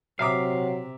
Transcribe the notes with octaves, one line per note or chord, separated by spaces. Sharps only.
C3 F#3 E5 F5 A#5 D6